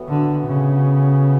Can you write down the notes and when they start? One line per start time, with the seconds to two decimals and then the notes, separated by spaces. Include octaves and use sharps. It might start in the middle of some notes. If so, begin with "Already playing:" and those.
Already playing: A2 E3 B3 F#4
0.08 D3
0.46 C#3